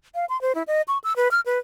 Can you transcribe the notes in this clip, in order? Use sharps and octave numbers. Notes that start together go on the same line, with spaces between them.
F5
C6
C5
E4
D#5
C#6
E6
B4
F6
B4